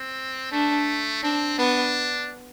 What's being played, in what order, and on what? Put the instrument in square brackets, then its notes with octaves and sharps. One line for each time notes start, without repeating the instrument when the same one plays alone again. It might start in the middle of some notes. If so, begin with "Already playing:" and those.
Already playing: [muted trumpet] C4
[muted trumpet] A3 [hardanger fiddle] D4
[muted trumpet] C4 [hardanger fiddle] D4
[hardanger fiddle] B3 [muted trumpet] D4